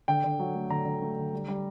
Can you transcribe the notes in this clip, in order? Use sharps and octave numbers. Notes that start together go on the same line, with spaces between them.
D3 G5
D3
F#3
A3
D3 A#5
D3
A3
D3
G3
G3